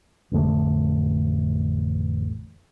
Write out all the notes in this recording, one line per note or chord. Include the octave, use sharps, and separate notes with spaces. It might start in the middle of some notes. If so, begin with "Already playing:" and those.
A1 F2 D3 A3